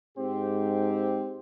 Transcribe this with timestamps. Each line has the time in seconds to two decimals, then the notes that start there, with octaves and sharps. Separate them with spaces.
0.18 G#2 C4 G4